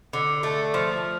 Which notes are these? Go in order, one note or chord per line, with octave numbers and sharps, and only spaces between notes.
D3
A3
F3